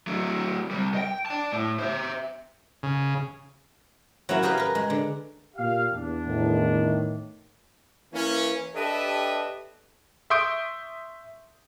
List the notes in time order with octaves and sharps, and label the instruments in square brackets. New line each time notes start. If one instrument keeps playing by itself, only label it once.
[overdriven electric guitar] F#3 A3
C3 G3
D#5 G5
D5 A5
A2
C5 E5
[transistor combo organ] C#3
[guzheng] F#3 A#3 C#4 E4 F#4
G4 G#4 A#4 B4 F5
A#4 B4
G#3
D3
[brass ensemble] A#2 G4 F5
E2 D4
[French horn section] A2 D#3
[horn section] E3 A#3 C#4
D4 G4 A4 B4 D#5 E5
[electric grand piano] E5 C6 C#6 D#6 G6 D7